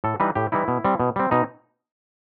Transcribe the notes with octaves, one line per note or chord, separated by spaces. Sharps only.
A2 A4
E3 G3 D#4 B4
A2 G4
E3 G3 D#4 E4
B2
G3 C4
B2
G3 C4
B2 D#4